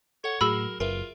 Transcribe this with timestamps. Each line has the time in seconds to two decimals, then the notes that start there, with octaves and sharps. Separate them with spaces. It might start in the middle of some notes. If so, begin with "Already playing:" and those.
0.24 A4 C#5 F#5
0.41 A2 F#3 F#4 G#4 A#4 B5 E6
0.80 F#1 F4 A#4 B4 E5